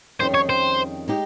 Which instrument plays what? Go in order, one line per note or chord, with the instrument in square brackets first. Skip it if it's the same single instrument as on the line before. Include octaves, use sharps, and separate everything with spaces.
[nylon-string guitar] F2 D#3 G3 C#4 G#4 [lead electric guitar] C5
[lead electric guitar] C#5
C5
[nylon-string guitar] G#3 D#4 G4